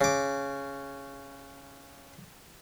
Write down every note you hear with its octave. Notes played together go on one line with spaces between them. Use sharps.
C#3 D6